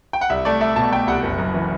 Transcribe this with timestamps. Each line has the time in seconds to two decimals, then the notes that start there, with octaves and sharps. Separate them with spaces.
0.13 G5
0.21 F#5
0.30 C2 E5
0.45 A3 D5
0.61 A3 E5
0.76 B2 A5
0.92 A3 G5
1.07 C2 F#5
1.23 F#1
1.39 F#2
1.54 E3